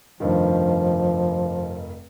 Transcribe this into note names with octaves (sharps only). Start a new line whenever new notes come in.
F1 G2 D#3 F3